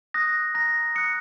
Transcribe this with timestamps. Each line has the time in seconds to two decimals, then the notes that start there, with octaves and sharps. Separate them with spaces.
0.14 D#6 F#6 A#6
0.54 A#5 A#6
0.95 D#6 F#6 C#7